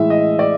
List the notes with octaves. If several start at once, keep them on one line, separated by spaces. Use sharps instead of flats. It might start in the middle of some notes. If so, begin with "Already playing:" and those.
Already playing: A2 E3 G#3 E5
D#5
D5